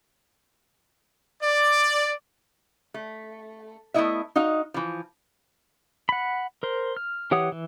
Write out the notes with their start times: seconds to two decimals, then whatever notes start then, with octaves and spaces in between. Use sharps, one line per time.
1.42 D5
2.94 A3
3.94 A3 B3 D4 E4 D#5 E5
4.36 D#4 F#4 D#5 F5
4.74 E3 F3
6.09 F#5 B5
6.63 A#4 C5
6.97 F6
7.31 E3 G4 C#5 F#5 D#6
7.52 E3